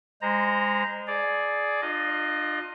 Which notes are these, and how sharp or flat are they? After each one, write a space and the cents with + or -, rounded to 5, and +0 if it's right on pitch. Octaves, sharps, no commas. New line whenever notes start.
G#3 -25 C5 -15 A#5 +0
G#4 +15 D5 +0
D4 +40 F4 +15 D#5 +0